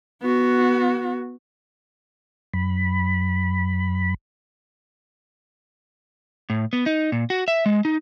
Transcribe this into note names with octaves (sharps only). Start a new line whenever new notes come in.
B3 F#4
F#2 B5
A2
B3
D#4
A#2
F#4
E5
G#3
D#4